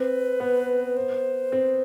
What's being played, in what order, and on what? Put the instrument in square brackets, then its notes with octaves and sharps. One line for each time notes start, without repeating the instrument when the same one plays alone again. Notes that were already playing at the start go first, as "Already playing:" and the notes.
Already playing: [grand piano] C4 [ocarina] B4
[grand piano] B3
[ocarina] C5
[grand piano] C4